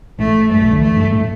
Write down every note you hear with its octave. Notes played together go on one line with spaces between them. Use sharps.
A1 A2 A3
G2 A3
B1 B2
D2 D3
E2 E3 A3
G2 G3
A2 A3